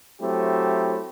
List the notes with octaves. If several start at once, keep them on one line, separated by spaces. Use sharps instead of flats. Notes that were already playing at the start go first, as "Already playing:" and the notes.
F#3 A3 C4 E4 G4